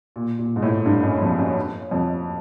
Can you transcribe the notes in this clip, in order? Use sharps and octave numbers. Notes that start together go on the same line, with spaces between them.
A#2
A#2
G#2
A2
G2
F#2
F2
F#2
F2